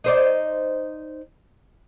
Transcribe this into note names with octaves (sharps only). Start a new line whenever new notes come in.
D#4 C5 D5